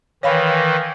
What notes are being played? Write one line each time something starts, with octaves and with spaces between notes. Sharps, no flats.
D#3 E3 C#5 F5 B5